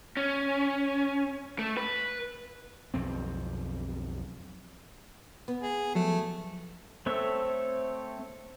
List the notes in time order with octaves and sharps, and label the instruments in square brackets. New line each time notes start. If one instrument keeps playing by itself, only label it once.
[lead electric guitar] C#4
A3
B4
[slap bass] B1 F2 C4
[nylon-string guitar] B3
[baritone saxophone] G#4
[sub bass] F3 [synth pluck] F#3 [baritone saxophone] A3
[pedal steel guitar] A3 C4 A4 C#5 E5